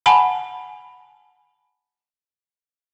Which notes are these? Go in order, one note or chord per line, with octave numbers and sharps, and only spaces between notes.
F#5 G#5 A5 B5